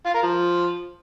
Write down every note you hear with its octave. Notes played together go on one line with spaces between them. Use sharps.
F4
A#4
F3